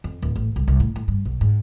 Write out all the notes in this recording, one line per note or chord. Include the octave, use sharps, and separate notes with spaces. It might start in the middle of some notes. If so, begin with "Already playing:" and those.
F2
D1
A1
C2
C2
A2
A2
G2
B1
G#2